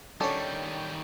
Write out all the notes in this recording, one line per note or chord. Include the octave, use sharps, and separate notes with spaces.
D#3 G3 C#4 D4 F#4 A4 C#5